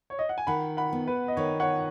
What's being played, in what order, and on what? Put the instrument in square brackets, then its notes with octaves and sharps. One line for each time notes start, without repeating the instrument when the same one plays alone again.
[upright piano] C#5
D#5
F#5
G#5
[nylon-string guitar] D#3 [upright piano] F#5 B5
[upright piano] F#5 B5
[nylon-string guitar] B3
[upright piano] B4
D#5
[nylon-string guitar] D#3 [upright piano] C#5
[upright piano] C#5 F#5